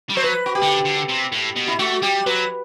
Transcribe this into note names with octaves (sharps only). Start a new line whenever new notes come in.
G3
F#3 C5
B4
F#4
G4
D3
D3
C3
A2
B2
E4
A3 F#4
G3 G4
F#3 B4